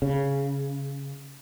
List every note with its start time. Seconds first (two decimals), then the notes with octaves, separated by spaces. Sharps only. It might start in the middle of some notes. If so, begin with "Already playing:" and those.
0.02 C#3